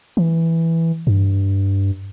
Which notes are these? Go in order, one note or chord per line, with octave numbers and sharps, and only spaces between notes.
E3
G2